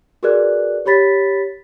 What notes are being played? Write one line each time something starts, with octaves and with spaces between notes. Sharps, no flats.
F#4 G#4 A#4 B4 D5 F#6
G4 C#5 B5 A6 B6